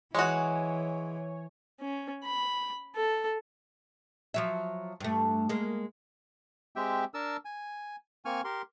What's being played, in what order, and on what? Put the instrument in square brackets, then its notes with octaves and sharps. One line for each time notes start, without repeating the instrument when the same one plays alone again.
[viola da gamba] E3 [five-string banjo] G#3 F#4 [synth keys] C#5 G#5
[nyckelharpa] C#4
B5
A4
[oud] F3 F#3 E5
G2 A3
G#3 A#3
[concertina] G#3 C4 G4 E5 G5
D4 A#4 A5 E6
G#5
A#3 C4 G#5 C#6 F6
G4 A#4 C6